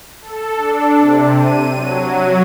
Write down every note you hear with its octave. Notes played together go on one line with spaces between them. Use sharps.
A4
D4
C3
D#7
F#3
F#3